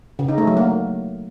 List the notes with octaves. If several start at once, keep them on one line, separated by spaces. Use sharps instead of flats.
C#3
D#4
A3
F#3
A#3